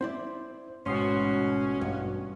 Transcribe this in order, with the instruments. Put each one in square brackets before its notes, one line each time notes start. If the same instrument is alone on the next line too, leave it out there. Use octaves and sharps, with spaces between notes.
[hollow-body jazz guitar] C4 E4 D5 [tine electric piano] C5
[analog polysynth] A1 B2 F#4 [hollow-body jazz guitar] G#2 [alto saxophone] C#4 [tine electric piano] C6 D#6 C7
[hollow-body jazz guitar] G2